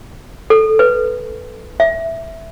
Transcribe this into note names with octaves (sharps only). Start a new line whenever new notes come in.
A4
B4
E5